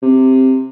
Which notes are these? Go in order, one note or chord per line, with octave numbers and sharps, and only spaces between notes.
C3